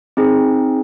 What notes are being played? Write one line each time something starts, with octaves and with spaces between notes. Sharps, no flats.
C4 D#4 G#4